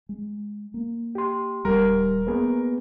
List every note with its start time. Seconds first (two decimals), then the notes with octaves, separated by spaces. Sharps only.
0.09 G#3
0.74 A#3
1.15 G4 C6
1.65 D#1 G3 A#4
2.27 A#3 B3 G#4 B4